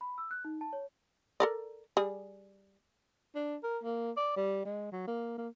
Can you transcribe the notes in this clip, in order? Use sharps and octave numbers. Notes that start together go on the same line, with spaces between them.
B5
E6
F#6
D#4
A5
C#5
A4 A#4 D5
G3 G#4
D4
A#4
A#3
D5
G3
G#3
F#3
A#3
A#3